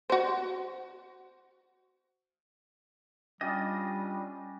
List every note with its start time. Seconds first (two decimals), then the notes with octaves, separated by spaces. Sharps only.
0.10 F#4 C5
3.41 G3 C#4 D4 F4 G4 D#5